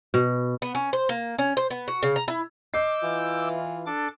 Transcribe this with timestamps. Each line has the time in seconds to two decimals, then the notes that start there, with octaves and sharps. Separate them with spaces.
0.14 B2
0.62 B3
0.75 C#4
0.93 C5
1.09 A#3
1.38 C#4
1.57 C5
1.70 B3
1.88 F#4
2.03 C#3
2.16 A#5
2.28 E4
2.74 D#5 D6 E6 G6 C7
3.03 E3 F4
3.86 D4 A4 D6